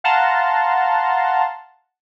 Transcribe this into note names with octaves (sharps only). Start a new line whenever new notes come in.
F5 F#5 A5 A#5 C6